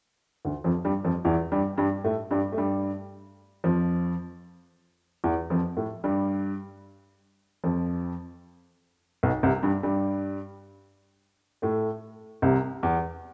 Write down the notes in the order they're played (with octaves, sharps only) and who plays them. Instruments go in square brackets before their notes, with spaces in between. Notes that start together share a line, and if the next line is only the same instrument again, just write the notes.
[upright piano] D2 D3
F2 F3
G2 G3
F2 F3
E2 E3
G2 G3
G2 G3
A2 A3
G2 G3
A3
G2 G3
F2 F3
E2 E3
F2 F3
A2 A3
G2 G3
F2 F3
B1 B2
C2 C3
G2 G3
G2 G3
A2 A3
C2 C3
E2